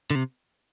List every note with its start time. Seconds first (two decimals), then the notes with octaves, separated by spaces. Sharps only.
0.10 D3
0.15 C3